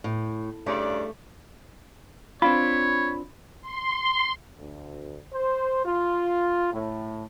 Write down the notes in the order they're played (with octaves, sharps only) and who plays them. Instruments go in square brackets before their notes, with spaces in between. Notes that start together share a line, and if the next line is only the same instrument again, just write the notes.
[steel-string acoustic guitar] A2
[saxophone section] G2 C#3 D5 [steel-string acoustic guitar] A3
[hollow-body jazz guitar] C4 D4 F4 [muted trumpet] C#5 [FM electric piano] B5
[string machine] C6
[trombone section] D2
C5
F4
A2